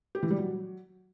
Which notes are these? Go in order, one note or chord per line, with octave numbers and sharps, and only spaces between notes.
G4
E3
G3
F#3